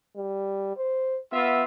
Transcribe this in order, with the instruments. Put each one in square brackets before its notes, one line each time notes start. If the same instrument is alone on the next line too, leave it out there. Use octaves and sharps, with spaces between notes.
[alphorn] G3
C5
[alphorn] B3 [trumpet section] F4 E5